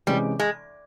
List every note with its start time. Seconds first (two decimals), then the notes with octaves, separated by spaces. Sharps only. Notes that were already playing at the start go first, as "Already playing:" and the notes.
0.07 C3 E3 G3 G#3 C#4
0.40 G#3